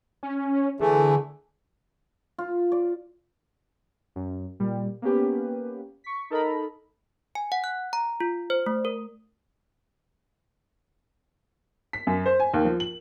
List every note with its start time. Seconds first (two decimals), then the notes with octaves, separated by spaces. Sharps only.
0.23 C#4
0.80 D3 E3 A3 G#4
2.38 F4
2.72 D5
4.16 F#2
4.60 A#2 G3
5.02 A#3 B3 C#4 G4 B4
6.04 C#6 B6
6.30 D#4 A4 A#4 D#5 A#5 B5
7.35 G#5
7.52 F#5
7.64 F#6
7.93 A#5
8.20 F4
8.50 C5
8.66 A3
8.85 A#4
11.93 B6
12.07 F#2
12.26 C5
12.40 G#5
12.54 D#2
12.65 F3
12.80 F#7